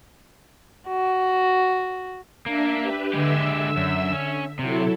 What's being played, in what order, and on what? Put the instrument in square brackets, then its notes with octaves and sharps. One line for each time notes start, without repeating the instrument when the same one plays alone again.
[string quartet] F#4
[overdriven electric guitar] A#3 [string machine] D4 E5
[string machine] G4 B4
[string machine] D3 E5 E6 [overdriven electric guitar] G#3 G4
[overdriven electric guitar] F#2
C#4
[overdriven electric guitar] C3 [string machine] F#3 E4 A4